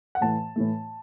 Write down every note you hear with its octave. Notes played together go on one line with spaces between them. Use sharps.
F#5
A2 E3 A3 A5
A2 E3 A3